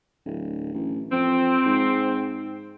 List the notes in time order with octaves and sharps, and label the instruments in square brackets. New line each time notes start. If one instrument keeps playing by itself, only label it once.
[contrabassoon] D1
A1
[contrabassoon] F2 [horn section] C4
[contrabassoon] G#2